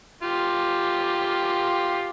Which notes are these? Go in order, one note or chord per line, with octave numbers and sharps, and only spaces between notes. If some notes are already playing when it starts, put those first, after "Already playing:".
F4 G4